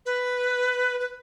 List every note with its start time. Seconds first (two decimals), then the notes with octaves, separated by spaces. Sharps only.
0.06 B4
1.00 B4